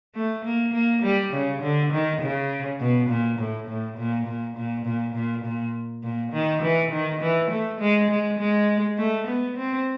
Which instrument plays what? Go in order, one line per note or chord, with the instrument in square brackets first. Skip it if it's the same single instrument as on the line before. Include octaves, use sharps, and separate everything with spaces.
[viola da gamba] A3
A#3
A#3
G3
C#3
D3
D#3
C#3
B2
A#2
A2
A2
A#2
A#2
A#2
A#2
A#2
A#2
A#2
D#3
E3
D#3
E3
A3
G#3
G#3
G#3
A3
B3
C4